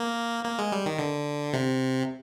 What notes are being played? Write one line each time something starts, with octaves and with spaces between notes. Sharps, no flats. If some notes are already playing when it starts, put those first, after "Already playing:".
Already playing: A#3
A#3
G#3
G3
D#3
D3
C3